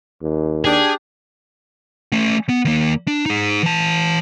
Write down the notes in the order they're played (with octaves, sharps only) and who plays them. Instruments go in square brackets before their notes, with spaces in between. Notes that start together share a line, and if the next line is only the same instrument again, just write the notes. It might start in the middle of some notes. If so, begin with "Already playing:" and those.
[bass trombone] D#2
[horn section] D4 G4 [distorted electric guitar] G#4
[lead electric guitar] A3 C#4
B3
D#2 A#3
D4
D#4 G#4
E3 A5